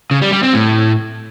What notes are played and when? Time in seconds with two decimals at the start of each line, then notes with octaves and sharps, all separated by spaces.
0.11 C#3
0.22 G3
0.32 G3
0.43 C4
0.53 A2